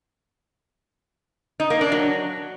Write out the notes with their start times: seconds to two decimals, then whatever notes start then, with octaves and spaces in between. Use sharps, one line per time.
1.60 D#4
1.70 A#3
1.81 D4
1.92 F#3